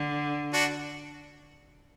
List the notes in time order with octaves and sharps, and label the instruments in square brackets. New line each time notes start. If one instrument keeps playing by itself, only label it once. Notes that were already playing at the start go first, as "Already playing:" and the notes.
Already playing: [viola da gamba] D3
[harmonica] D4 F#4